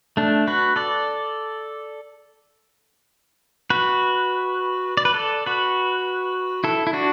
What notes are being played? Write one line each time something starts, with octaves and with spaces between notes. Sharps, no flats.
A3 D4
F#4 B4
A4 D5
F#4 B4
D5
B4
A4 D5
F#4 B4
E4 A4
E4
D4 F#4